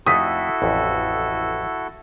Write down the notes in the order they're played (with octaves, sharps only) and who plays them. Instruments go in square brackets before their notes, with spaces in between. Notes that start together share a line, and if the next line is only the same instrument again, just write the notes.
[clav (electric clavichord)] F2 A3 D#4 [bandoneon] E4 F#4 A4 [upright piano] D#6 B6
[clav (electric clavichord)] A1 F2